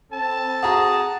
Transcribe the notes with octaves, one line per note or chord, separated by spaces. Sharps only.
C4 A4 A5
F#4 G#4 A#5